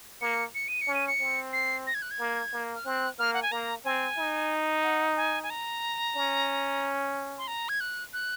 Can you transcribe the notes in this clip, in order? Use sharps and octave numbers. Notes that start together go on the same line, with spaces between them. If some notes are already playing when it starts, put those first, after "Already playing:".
A#3 C#7
C#7
D#7
C#7
C#4
D#7
C#7
C4
C7
A#6
G#6
F#6
G#6
A#3
A#3
F6
C4 F#6
A#3 F6
F#5
G#5
A#3 A#5
C4 G#5
D#4
F#5
G#5
G#5
A#5
C#4
C6
A#5
G#6
F#6
F#6